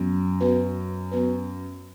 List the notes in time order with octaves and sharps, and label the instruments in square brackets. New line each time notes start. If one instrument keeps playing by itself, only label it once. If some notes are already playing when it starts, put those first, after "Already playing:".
Already playing: [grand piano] F#2 [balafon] F#3 B3
[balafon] F#3 B3 F#4 B4
F#3 B3 F#4 B4